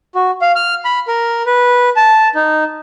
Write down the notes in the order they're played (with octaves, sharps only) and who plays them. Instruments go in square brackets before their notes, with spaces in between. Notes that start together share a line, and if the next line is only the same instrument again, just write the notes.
[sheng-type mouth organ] F#4
F5
F6
B5
A#4
B4
A5
D#4